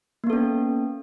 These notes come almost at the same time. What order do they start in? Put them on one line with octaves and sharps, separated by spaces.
A#3 B3 A4 C#4